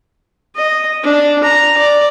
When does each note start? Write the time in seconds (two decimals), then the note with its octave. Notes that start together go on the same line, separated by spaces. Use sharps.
0.56 D#5
1.03 D4
1.44 A#5
1.77 D5